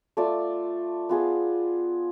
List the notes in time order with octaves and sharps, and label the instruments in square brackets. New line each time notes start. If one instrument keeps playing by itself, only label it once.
[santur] A3 F4 A4 D5
B3 F4 G#4